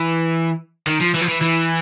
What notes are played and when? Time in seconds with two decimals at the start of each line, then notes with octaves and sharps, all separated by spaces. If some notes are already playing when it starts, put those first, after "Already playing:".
Already playing: E3
0.87 D#3
1.01 F3
1.15 E3
1.22 F3
1.28 E3
1.42 E3